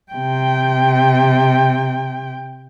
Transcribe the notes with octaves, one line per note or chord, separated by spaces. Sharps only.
C3 G5